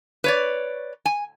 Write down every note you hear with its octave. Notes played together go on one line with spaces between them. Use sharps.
B4 C#5 D5
G#5